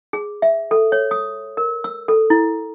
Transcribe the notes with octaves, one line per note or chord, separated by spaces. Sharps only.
G#4
E5
A4
C#5
D#6
A#4
E6
A4
E4